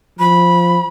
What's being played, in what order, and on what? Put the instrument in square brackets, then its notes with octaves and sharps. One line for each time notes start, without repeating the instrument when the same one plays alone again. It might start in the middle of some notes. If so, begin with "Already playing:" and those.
[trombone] F3 [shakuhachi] B5